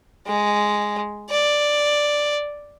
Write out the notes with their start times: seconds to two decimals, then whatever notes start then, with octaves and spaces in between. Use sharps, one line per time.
0.26 G#3
1.30 D5